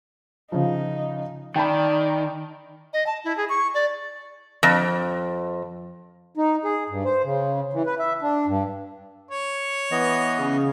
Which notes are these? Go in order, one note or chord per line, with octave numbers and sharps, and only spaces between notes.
C#3 F3 D#4
D#3 D5 G5 A5 B5
D#5
A5
E4
G#4
C#6
D5
F2
D#4
G#4
G2
C5
C#3
E3
B4
E5
D4
G2
C#5
E3 B3 D#5
C#3